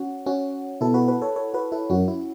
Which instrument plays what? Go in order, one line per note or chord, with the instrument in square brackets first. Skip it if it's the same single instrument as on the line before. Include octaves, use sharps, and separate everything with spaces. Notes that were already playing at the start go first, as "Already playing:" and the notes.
Already playing: [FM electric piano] C#4 F#4
C#4 F#4
[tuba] B2 [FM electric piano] E4 A4
[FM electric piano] F#4 B4
F#4 B4
A4 C#5
A4 C#5
F#4 B4
E4 A4
[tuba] F#2 [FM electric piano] C#4 F#4
[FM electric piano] E4